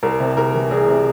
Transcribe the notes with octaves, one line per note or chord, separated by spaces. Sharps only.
C2 A#4
C3
C2 A#4
E3
C2 G#4
C3